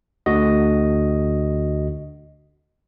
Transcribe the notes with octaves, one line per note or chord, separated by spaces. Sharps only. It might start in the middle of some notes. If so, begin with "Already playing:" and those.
D2 D3 F#4 D#5